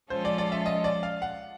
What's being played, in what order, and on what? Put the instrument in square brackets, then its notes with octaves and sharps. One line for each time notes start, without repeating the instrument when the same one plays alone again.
[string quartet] F3 G#3 C#4 F4 A4 [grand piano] C5
[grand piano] D5
D5
E5
D#5
D5
F5
F#5